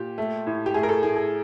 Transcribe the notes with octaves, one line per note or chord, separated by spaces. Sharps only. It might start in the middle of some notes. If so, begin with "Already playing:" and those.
Already playing: A#2 G4
A3
A2
G4
A3 G#4
A#4
A4
A2 G#4
G#4